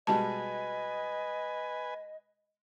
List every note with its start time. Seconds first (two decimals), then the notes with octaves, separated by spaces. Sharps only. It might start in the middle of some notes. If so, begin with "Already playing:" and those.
0.07 B2 G3 G#3 B4 D#5 G#5 A5